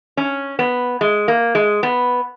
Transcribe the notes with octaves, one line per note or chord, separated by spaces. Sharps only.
C#4
B3
G#3
A#3
G#3
B3